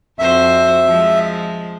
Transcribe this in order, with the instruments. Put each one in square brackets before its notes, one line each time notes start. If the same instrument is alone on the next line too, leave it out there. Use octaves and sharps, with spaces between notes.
[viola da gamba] F2 F#4 C5 [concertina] E5
[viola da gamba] F3 G#3